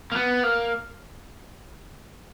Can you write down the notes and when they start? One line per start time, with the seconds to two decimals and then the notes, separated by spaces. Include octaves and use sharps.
0.12 A#3
0.16 B3
0.43 A#3